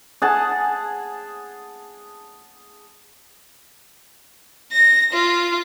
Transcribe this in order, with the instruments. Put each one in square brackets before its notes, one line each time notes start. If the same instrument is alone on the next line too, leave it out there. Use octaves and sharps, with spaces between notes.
[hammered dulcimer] G#4 F#5 A5
[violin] A#6
F4